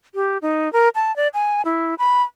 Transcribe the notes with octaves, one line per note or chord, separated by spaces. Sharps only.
G4
D#4
A#4
A5
D5
G#5
E4
B5